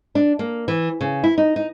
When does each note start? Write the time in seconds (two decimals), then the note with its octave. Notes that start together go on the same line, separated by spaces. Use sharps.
0.15 D4
0.39 A#3
0.68 E3
1.01 C#3
1.24 E4
1.38 D#4
1.56 D#4